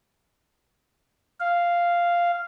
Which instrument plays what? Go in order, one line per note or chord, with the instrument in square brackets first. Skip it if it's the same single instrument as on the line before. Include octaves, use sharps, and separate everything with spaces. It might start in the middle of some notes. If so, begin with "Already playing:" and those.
[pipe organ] F5